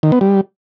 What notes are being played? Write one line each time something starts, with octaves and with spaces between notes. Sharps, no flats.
D#3
B3
G3